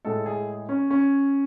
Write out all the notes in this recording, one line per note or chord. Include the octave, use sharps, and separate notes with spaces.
A2 G#3 A4
G#4
C#4
C#4